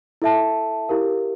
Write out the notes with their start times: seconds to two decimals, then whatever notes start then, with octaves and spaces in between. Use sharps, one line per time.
0.22 E4 A4 E5 A5
0.89 E4 G4 A#4 F5